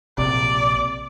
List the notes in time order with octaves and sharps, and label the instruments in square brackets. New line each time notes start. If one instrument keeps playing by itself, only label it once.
[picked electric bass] A#1 C3 [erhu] D5